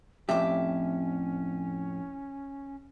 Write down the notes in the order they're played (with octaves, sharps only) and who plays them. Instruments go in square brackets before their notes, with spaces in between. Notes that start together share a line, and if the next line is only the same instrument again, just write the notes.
[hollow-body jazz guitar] F2 A2 G4 [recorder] C#4 [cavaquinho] E5 D6